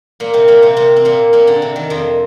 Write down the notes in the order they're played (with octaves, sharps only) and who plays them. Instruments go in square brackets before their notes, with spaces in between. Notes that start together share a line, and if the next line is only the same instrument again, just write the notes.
[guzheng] A#2 A#3
C3 C4
A#2 A#3
C3 C4
C3 C4
C4
A#2 A#3
A#2 A#3
D3
C3
D#3
F2 F3